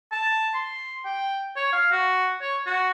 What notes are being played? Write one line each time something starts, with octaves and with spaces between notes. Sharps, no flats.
A5
C6
G5
C#5
F5
F#4
C#5
F#4